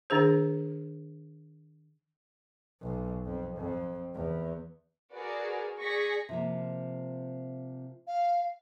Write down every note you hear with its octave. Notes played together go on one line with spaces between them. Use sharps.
D#3 D4 G#4 C5
B1
F2
F2
E2
F#4 G#4 A#4 B4 D5
G#4 D5 C#6 A#6 B6
C3 F3 A#3
F5